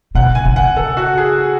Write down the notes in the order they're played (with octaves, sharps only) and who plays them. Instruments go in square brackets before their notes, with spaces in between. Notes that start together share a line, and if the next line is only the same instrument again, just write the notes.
[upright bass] B2 [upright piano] F#5
[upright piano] G#5
[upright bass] C#3
[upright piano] F#5
A4
F#4
G#4